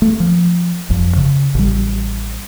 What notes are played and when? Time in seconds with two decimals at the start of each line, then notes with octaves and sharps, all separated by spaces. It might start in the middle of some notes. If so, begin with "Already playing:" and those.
0.02 A3
0.20 F3
0.90 G1 F2
1.17 C#3
1.55 A1 G3